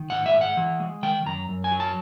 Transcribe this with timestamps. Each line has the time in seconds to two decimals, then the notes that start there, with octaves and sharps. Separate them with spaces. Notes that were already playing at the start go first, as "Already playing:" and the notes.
Already playing: D#3
0.10 G#2 F#5
0.26 E5
0.33 G#2
0.41 F#5
0.57 E3
0.80 G#3
1.03 D#3 G5
1.26 F#2 A#5
1.49 F#2
1.64 G#5
1.71 F#3
1.80 A5